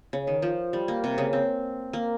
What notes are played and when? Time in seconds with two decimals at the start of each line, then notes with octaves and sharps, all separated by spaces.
0.13 C#3
0.27 D#3
0.42 F3
0.73 G3
0.88 A#3
1.04 C3
1.18 C#3
1.33 C4
1.93 A#3